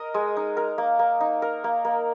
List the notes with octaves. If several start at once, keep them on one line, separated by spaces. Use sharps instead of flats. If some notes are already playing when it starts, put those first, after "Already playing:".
Already playing: A#4 D#5
G#3
D#4
A#4
A#3
A#3
D#4
A#4
A#3
A#3